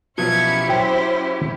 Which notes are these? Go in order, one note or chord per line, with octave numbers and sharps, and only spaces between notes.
B2 F3 F#3 C#4 E4 G4 G#6 C#7
F#3 C5 G5